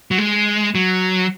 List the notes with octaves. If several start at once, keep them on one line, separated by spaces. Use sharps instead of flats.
F#3
G#3
F#3